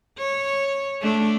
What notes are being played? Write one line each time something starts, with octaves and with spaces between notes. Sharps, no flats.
C#5
A3 D4